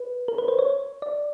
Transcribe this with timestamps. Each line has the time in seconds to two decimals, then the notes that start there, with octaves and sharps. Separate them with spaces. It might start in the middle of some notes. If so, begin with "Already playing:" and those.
Already playing: B4
0.28 A#4
0.38 B4
0.48 C5
0.59 C#5
1.02 D5